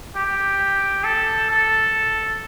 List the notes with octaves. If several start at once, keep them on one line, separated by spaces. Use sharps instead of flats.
G4
A4
A4